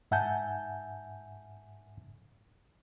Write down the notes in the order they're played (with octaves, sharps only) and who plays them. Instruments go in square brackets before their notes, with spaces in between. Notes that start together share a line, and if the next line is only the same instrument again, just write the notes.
[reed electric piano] G#2 E5 F#5 G#5 A5 G6